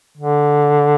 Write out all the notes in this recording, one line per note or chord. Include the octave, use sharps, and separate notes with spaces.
D3